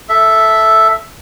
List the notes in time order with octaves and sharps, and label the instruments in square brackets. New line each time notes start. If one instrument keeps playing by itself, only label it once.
[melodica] A4 E5